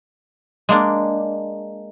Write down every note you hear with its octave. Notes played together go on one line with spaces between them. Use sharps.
G#3 A#3 D4